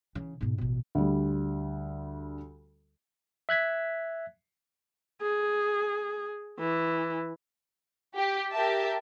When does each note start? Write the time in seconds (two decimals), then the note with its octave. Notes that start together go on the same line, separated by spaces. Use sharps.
0.15 C#3 E3
0.41 G#2 B2
0.58 A1 B2
0.95 D2 G3
3.49 E5 F#6 G#6 B6
5.21 G#4
6.59 E3
8.15 G4
8.52 G4 A#4 E5 A5